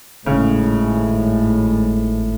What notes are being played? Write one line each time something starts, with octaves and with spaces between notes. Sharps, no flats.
G#1 A2 C#3 G#3 A3